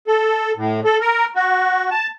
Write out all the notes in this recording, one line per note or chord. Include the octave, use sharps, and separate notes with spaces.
A4
A2
A4
A#4
F#4
A5